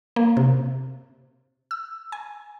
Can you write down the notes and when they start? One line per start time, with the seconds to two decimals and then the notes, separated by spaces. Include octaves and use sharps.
0.16 A#3
0.37 C3
1.71 E6
2.12 G#5